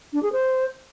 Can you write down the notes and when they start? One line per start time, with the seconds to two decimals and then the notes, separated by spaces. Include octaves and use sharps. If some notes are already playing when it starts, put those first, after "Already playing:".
0.13 D4
0.23 G#4
0.32 C5